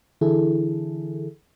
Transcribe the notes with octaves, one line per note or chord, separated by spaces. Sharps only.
D3 E3 E4 G#4 A4